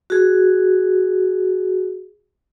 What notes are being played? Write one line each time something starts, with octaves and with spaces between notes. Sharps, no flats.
F#4 G#4